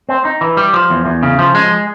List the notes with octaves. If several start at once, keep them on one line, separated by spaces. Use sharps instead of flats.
C4
D#4
E3
G3
F3
E2
E2
C#3
F3
G#3